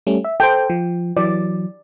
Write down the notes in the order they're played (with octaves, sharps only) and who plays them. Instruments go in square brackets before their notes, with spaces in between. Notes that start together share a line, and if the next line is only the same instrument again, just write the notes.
[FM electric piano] G3 A3 C#4
E5
[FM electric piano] A4 C5 [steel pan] G5
[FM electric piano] F3
[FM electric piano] E3 F#3 [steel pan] D5